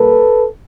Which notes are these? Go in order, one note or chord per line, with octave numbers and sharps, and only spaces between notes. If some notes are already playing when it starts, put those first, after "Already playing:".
Already playing: A#2 G3 A#3 A4 B4